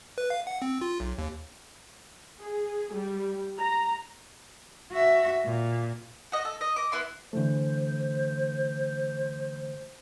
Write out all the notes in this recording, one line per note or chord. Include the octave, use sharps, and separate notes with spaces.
B4
F5
F#5
C4
F4
B1
D#2
G#4
G3
A#5
F#4 E5
A#2
F#4 D#5
A4
D#5
D#5 D6
B3 E4 C6
D3 E3 A3 C5